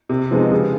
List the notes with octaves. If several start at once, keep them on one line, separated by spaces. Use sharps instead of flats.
C3
F3 G#3 B3 D#4
C#3